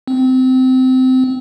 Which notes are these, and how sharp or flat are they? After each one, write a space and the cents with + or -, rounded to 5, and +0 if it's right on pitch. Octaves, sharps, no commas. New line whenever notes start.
C4 -20